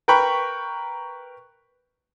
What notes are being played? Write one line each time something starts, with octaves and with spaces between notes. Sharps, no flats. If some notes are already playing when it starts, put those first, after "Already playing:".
A#4 B4 G5 A#5 B5 C#6